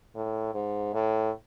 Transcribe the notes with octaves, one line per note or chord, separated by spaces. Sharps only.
A2
G#2
A2